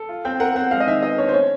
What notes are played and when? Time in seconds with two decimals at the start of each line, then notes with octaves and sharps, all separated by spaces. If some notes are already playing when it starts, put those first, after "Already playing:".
Already playing: A4
0.09 F4
0.25 C4 G5
0.40 A#4 F#5
0.56 C4 F#5
0.71 G#3 F5
0.80 D#5
0.87 D#3 E5
1.02 B3 D#5
1.18 D4 C#5
1.28 C5
1.34 C#4 C#5